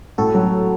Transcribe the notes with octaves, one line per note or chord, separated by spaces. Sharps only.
A2 F#4 A4
F#3